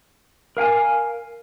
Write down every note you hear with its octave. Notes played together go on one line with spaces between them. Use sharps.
A#4 F5 G5 G#5